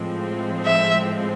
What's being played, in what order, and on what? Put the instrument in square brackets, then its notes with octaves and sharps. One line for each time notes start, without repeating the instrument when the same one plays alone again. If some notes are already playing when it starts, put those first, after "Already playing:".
Already playing: [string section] A2 F3 G#3 C4
[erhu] E5